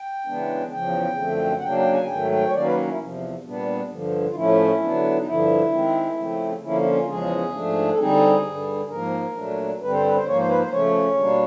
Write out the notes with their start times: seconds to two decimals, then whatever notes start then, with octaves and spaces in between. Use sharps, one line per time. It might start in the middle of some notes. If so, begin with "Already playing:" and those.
Already playing: G5
0.26 C#3 E3 G#3 B3 D4
0.72 E2 C#3 F3 G5
1.17 F#2 D3 F3 A3 C4
1.58 F#5
1.62 C#3 F#3 A#3 D4 G5
1.77 G5
1.93 G#5
2.08 G#2 D#3 F#3 A3 G5
2.31 G5
2.46 C#5
2.54 D#3 F#3 A#3 C#4 D5
2.65 B4
2.77 A#4
2.87 E4
2.99 E2 C3 F3
3.44 A#2 G3 B3 D4
3.90 G2 D3 F3
4.27 F4
4.35 A2 F3 A3 C#4 E4
4.81 D3 F#3 B3 D4
5.17 D#4
5.26 G2 D3 F3 E4
5.72 D#3 G#3 C4
6.17 C#3 F3 A3 C4
6.62 D3 F3 A#3 C#4 E4
6.81 E4
6.86 F4
7.08 E2 C#3 F3 G#3 G#4
7.53 G#2 F3 A3 D4
7.90 A4
7.99 D3 G3 C4 D#4 G#4
8.44 G2 D3 G3
8.89 G#2 F3 A#3 A#4
9.36 A#2 F#3 A3 D4
9.80 G2 D3 G3 C4 B4
9.92 C5
10.04 B4
10.14 C5
10.26 G#2 F3 A#3 C#5
10.38 C5
10.48 B4
10.58 C5
10.72 C#3 F3 A3 C#4 C#5
11.17 B2 G3 A#3 D4